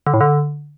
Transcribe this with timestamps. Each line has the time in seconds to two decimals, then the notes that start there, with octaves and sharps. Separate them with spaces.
0.06 D3
0.14 A2
0.21 D3